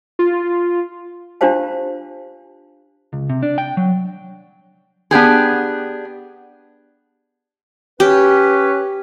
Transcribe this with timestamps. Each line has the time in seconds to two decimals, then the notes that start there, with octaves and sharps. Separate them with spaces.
0.19 F4
1.41 D4 F4 G4 C5 F5 A5
3.13 C#2
3.30 C3
3.43 D4
3.58 G5
3.77 F#3
5.11 B3 D4 G4 G#4
8.00 C#4 G4 B4